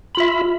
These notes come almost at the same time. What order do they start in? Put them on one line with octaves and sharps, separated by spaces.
B5 F4 E5